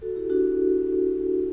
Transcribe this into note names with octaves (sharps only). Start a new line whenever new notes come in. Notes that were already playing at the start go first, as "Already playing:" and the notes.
F#4 A4
E4 G4
D4 F#4
E4